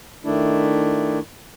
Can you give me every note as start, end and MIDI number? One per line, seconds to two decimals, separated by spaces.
0.24 1.19 51
0.24 1.19 57
0.24 1.19 62
0.24 1.19 64